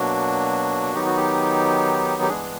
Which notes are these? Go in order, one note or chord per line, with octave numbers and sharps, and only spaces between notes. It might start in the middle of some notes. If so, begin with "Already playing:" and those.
Already playing: B2 F#3 A#3 D4 F#4
D#3 F#3 B3 D#4 G4
F#4
G4
G4
G2 E3 G#3 B3 D4 G#4